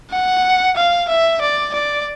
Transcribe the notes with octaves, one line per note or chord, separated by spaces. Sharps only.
F#5
F5
E5
D5
D5